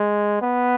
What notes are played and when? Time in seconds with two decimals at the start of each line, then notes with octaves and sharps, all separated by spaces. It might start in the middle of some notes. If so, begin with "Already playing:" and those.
Already playing: G#3
0.42 B3